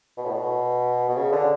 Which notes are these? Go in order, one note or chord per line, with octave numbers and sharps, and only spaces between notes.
B2
A2
B2
B2
C#3
D3